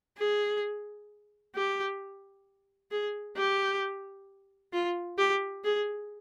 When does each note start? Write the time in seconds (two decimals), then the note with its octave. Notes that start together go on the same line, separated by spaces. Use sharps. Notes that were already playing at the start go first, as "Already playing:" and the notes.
0.18 G#4
1.55 G4
2.91 G#4
3.36 G4
4.73 F4
5.18 G4
5.64 G#4